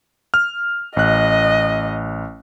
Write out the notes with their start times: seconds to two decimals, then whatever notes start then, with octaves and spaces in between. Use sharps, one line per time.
0.34 F6
0.97 A1 D#5 F#6